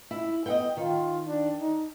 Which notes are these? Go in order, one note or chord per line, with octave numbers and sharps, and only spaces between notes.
E4
B3 D#5 F#5 G5
D#3 F4
D4
D#4